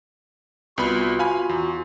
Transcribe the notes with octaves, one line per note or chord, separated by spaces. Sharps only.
C2 B3 F4 F#4 B5
F5 G#5 B5
E2